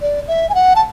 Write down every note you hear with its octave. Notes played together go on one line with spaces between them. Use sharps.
D5
E5
G#5
F#5
A5